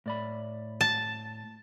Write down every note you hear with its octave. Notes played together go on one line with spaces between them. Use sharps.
A2 D5 B5
A5